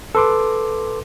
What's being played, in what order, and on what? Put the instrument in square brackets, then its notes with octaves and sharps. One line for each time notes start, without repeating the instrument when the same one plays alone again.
[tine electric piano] A4 B4 C6 D6